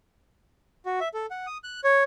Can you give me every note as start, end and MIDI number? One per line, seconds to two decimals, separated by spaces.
0.86 1.00 66
1.00 1.08 76
1.14 1.26 69
1.31 1.46 78
1.47 1.58 87
1.64 1.81 90
1.84 2.03 73